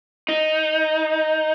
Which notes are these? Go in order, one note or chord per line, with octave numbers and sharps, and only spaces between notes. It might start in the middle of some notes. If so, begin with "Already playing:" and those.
D#4